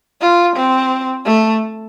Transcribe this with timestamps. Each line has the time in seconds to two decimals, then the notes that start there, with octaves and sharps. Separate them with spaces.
0.21 F4
0.56 C4
1.26 A3